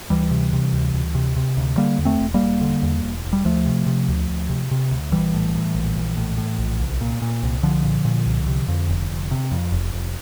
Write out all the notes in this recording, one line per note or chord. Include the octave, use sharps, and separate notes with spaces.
D2 E3 G3
C3
C3
D2
D2
C3
C3
D2
D3 G3 A#3
E2
A3 C4
E1
G3 A#3
E1
D3
E2
E1
E1
G3
D2 F3 A3
C3
C3
D2
D2
C3
C3
D2
A#1 E3 G3
A2
A2
A#1
A#1
A2
A2
A#1
C2
A#2
A#2
C2
C2 D3 F3
A#2
A#2
C2
C3
F2
F1
F1
C3
F2
F1
F1